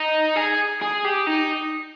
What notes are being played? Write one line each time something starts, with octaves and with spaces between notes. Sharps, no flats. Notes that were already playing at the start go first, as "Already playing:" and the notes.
Already playing: D#4
G#4
G#4
G4
D#4